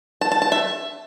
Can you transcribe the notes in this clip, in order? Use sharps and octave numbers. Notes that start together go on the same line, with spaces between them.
A5
A5
A5
E5